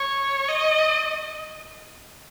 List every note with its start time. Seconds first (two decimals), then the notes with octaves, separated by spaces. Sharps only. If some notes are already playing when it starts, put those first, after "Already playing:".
Already playing: C#5
0.48 D#5